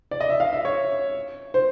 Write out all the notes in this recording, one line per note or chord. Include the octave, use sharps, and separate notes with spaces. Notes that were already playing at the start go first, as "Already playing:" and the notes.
D5
D#5
E5
F5
E5
C#5
C5